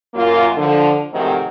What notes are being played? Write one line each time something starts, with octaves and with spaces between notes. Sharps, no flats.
F#2 A#3 F4
D3 F3
G#2 C3 D#3 F3 F#3 A3